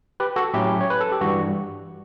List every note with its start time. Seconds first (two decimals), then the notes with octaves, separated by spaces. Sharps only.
0.20 G4 B4
0.36 F#4 A4
0.54 A2 F#3 C#4 E4 G4
0.81 C#5
0.90 B4
1.00 A4
1.12 G4
1.21 G2 E3 G3 F#4